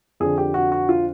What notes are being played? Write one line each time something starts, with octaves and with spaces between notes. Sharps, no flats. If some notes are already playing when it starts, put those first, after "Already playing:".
F2 D3 G#4
G4
F#4
F#4
F4